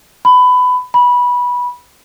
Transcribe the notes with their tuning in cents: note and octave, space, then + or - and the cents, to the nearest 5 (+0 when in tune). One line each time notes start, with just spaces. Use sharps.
B5 +20
B5 -15